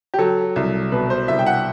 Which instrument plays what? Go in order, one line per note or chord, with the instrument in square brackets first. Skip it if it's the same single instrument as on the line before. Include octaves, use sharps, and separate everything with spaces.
[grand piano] G4
F#3 A4
C2
B2 B4
C5
C2 E5
G5
F#5